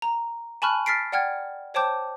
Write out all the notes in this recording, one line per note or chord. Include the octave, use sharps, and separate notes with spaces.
A#5
G#5 A5 B5 C#6 F6 F#6
F6 A6 B6 C7 D7
D5 F#5 G5 F6 G#6
C5 C#5 G5 A5 D6 G6